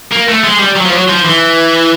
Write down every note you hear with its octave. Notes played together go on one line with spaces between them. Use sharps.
A#3
A3
G#3
G3
F#3
F3
F#3
F3
E3